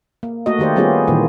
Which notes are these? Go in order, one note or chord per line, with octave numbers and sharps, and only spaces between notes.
A#3
A3 A#3 F#4 D#5
D#3 A3 G4 C5 D5
G3 B3 C#4 F4 G4 G#4
A#2 D#3 E3 A#3